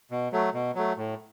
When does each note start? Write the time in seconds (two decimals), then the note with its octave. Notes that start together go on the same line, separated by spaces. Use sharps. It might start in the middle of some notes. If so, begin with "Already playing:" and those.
0.11 B2
0.32 F#3 A3
0.54 B2
0.75 F#3 A3
0.97 A2